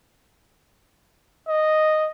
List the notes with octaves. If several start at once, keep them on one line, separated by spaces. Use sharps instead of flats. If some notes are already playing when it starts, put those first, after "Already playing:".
D#5